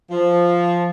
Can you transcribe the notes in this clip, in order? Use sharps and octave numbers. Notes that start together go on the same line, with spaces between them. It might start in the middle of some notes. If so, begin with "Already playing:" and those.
F3